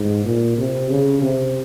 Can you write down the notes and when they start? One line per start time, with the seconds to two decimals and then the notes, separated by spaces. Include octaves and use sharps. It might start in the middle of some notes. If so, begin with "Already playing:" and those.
Already playing: G#2
0.25 A#2
0.58 C3
0.90 C#3
1.22 C3